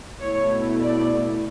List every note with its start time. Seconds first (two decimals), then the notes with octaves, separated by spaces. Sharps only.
0.19 B2 A3 E4 C#5
0.81 D5